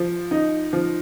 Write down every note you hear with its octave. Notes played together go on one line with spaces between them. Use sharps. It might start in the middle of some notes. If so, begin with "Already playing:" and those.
Already playing: F3
D#4
F3